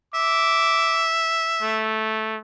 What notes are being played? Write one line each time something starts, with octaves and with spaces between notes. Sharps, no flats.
E5 D6
A3